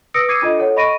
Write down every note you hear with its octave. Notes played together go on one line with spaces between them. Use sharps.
B4 D#6 E6 A#6 C#7 D7
D6 D#6 G#6 C7 C#7 D#7
D4 F4 A4 D#5
A4 C#5 F#5
D#5 B5 C#6 A#6 D7 D#7